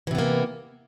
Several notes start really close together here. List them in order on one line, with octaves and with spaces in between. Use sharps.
E3 C3 B3 A#3